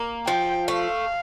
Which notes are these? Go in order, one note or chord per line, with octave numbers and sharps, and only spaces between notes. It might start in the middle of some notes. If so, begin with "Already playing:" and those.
Already playing: A#3
F3 G5
A3 F5